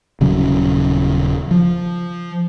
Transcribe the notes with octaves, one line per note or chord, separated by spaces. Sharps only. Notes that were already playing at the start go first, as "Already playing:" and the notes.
D#1 C#3 F#3 C#4
F3